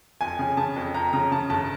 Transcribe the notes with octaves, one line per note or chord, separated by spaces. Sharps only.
F2 G#5
C#3
C#3 A5
F2
F2 A#5
C#3 A#5
C#3 A5
G1 A5